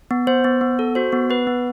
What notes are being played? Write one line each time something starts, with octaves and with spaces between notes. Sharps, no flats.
B3
B3 C5
B3
B3
A4
F#4 C5
B3
B3 B4
B3